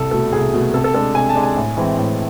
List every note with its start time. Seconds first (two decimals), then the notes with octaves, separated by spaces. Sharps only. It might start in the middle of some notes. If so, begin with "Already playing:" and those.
Already playing: C2 A4
0.11 B2 A3 A4
0.33 C2 G#4
0.53 B2 A3
0.74 C3 A4
0.84 A4
0.94 G#3 D4 A4
1.15 C3 G#5
1.29 A5
1.35 G#3 D4
1.43 G#5
1.56 A2
1.77 E3 G#3 C4 E4
1.97 A2